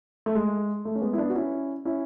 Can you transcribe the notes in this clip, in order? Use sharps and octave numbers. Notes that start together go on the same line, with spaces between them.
A3
G#3
A3
C#4
G#3 B3
E4
B3 D4
F#4
C#4 E4
C#4 E4